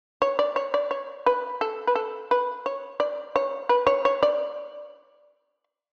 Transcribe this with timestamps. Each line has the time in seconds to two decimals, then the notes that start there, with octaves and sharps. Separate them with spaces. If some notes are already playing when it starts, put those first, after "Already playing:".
0.22 C#5
0.39 D5
0.56 C#5
0.74 D5
0.91 C#5
1.26 B4
1.61 A4
1.87 B4
1.95 A4
2.31 B4
2.66 C#5
3.00 D5
3.36 C#5
3.69 B4
3.87 C#5
4.05 C#5
4.23 D5